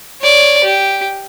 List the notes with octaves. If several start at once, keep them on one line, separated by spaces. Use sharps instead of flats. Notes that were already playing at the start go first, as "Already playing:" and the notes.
C#5 D5
G4